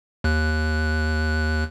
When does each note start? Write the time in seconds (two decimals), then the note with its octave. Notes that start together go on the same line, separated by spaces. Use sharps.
0.24 D#2 F#6